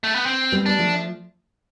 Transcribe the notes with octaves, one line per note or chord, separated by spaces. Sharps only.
A3
B3
C4
G3 B3
B3 D4
F3 A3